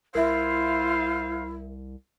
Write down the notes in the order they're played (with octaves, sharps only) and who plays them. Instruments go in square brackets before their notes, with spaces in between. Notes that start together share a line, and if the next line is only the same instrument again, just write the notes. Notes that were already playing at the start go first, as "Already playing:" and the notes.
[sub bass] C2 [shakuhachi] E4 [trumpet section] F4 C5 F5 [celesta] A#4 E5